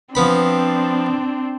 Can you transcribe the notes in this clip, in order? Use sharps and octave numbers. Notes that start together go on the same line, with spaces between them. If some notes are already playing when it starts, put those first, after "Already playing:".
F3 B3 C4 D4 B5